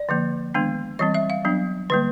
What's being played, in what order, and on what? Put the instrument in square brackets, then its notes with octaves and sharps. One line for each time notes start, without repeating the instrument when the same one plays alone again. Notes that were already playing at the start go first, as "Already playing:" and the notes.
Already playing: [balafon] D5
D3 F3 A#3
D#3 G#3 B3 D4
E3 G3 C4 D#5
E5
F5
F#3 B3 D4
D3 G3 A#3 B4